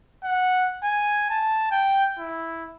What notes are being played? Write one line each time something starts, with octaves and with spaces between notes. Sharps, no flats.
F#5
G#5
A5
G5
E4